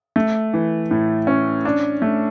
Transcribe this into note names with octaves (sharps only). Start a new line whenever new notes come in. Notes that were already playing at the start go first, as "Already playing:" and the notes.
A3
E3
A2
C#4
D4
A3